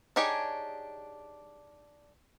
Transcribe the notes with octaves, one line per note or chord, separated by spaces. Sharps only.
D4 D#4 G4 G#4 C#5